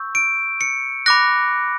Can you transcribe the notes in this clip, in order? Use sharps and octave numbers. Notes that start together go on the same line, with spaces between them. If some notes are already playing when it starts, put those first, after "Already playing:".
Already playing: C#6 E6 G6
D7
C#7
B5 D6 F#6 A#6